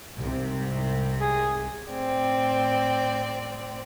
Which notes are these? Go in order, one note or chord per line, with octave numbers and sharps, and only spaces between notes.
C2 G#2 C3
G#4
A2 C4 D5